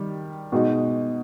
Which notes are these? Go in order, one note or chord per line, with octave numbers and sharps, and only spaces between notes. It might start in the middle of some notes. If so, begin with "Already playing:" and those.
Already playing: D#3 G3
B2 G#3 D#4